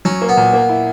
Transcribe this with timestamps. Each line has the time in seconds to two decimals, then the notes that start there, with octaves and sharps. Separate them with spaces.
0.05 F#3 C#4
0.22 A#3
0.29 B3
0.37 A#2
0.53 A#3
0.69 E4